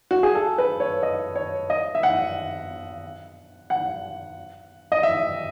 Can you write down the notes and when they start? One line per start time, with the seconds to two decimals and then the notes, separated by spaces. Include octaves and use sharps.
0.11 F#4
0.23 G#4
0.35 A4
0.58 B4
0.80 C#5
1.03 D#5
1.36 C#5
1.70 D#5
1.95 E5
2.03 F#5
3.70 F#5
4.92 D#5
5.03 E5